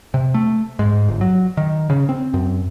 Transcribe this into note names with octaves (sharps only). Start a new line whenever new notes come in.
C3
A3
G#2
G1
F#3
D#3
C#3
C4
F#2